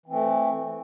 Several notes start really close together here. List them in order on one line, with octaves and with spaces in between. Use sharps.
E3 C4 A3